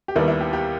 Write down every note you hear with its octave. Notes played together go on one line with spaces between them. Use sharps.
G4
D#2 D#3 G3 B3 E4
E4
G4
G4